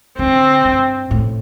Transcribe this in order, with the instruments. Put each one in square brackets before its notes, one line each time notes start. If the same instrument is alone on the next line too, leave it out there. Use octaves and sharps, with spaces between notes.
[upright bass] D3 [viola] C4
[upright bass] G2
A2